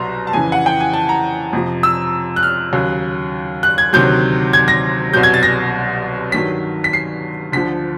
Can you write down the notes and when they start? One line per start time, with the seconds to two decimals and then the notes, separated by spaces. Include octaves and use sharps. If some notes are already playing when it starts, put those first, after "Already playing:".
Already playing: C2 B2 F#3 A#5 C6
0.27 A5
0.33 F2 C#3 E3 G#5
0.52 F#5
0.66 G5
0.80 G#5
0.93 A5
1.09 A#5
1.53 F2 C3 F3
1.83 E6
2.36 F#6
2.43 F6
2.73 D#2 C#3 F#3
3.63 F#6
3.78 G#6
3.93 D2 C3 D#3 F#3 G6
4.53 G#6
4.68 A#6
5.13 C2 B2 F#3 G6
5.23 G#6
5.34 A6
5.43 A#6
6.32 G2 D#3 F#3 B6
6.84 B6
6.93 C7
7.52 D2 D3 F3 B6